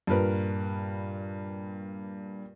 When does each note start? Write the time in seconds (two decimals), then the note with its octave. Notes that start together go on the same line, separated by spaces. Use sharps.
0.07 G2 A#2 A#4 B4